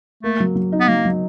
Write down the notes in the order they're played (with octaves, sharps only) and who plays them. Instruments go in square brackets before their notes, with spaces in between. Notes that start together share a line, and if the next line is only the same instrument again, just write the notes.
[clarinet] A3 [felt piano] A#3
[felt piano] F#3
F#3
D#4
[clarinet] B3
[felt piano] F#3 [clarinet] A#3
[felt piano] F#3